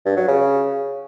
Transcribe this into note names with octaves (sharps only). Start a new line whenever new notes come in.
G2
F#3
C#3